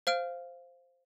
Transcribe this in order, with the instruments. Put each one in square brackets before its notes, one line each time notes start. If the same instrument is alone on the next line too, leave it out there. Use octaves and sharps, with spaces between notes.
[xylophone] C5 F5 F6 D7